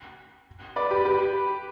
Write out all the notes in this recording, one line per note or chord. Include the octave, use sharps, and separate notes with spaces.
B4 D5
G4 B4
G4 B4